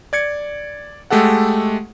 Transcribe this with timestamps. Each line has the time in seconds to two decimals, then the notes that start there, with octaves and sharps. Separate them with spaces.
0.13 D5 G#6 C#7
1.10 G#3 A3 G4 A4 F#5